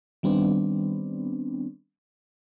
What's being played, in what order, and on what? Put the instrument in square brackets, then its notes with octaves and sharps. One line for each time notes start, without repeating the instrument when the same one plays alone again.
[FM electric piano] D#3 G3 B3 C4 D4